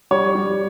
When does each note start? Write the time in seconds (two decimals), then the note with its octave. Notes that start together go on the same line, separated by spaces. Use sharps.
0.11 G3 C#5
0.35 G3